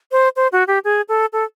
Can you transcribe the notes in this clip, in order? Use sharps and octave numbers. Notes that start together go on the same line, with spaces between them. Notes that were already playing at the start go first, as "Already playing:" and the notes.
C5
C5
F#4
G4
G#4
A4
A4